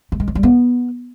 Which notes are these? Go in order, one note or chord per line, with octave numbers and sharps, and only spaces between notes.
A3
G#3
F#3
G3
B3